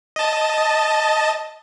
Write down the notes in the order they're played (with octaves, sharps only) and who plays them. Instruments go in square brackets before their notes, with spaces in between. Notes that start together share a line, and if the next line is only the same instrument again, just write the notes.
[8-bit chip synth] D#5 A5